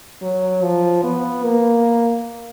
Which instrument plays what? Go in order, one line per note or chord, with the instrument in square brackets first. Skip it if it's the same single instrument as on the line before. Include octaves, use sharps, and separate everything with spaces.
[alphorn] F#3
F3
B3
A#3